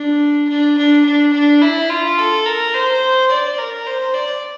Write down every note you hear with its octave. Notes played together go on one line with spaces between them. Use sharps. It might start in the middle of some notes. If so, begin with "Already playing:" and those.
Already playing: D4
D4
D4
D4
D4
E4
F4
A4
A#4
C5
D5
A#4
C5
D5